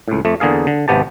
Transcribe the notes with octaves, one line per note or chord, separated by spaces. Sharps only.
C#2 A2
F2 A3
E2 D3 A#3 G#4 F5
D3
G#1 C3 B3 G4 A5